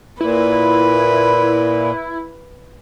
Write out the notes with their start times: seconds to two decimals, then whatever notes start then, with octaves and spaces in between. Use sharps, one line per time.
0.21 A#2 E4 B4